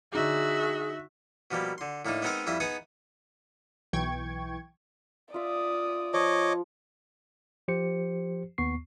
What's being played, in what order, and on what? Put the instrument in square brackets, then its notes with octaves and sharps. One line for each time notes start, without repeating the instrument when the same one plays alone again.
[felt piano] D3 D#4 D6 [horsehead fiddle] F#4 E5 [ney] G#4
[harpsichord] B2 F3 G3 A#3
D3 C6
A2 A#3 D4 D#4
G#3 B3 C4 D#4 A#4 D6
F2 G3 E4 E5 D#6
B3 D#4 G#4 B4 F#5 D#6
[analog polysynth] B1 E3 G5 C#6 G#6
[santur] F4 E5 [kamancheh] D5 D#6
[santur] F3 [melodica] C#5 D#5 D6
[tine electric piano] F3 G4 C5 C#7
D#2 B3 C#6 C7